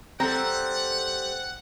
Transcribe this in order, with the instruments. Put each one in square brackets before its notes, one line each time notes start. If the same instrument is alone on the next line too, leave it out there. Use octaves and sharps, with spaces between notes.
[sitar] G3 A4 [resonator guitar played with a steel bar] C4 [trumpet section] F#5 [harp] A#5